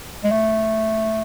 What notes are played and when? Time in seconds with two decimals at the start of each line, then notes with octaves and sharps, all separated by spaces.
0.24 G#3
0.32 A3